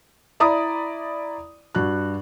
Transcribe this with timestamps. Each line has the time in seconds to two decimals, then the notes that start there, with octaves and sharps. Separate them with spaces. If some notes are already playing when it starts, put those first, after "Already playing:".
0.40 E4 D5 A#5 B5 D#6
1.75 G2 F#4 F#6